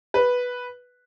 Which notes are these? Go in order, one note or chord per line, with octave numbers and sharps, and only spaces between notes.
B4